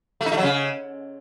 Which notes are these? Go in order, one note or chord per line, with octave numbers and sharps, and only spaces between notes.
A3
D#4
A3
F#3
C#3